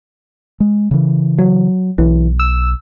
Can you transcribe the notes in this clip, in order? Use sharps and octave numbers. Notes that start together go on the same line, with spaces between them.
G#3
C#3 E3
F#3
B1 E3
E6